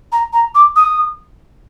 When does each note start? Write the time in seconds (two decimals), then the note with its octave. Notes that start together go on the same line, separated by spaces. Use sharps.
0.12 A#5
0.33 A#5
0.54 D6
0.75 D#6